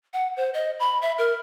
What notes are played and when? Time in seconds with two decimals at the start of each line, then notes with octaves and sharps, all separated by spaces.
0.13 F#5
0.37 C5
0.54 D#5
0.80 B5
1.02 E5
1.18 A#4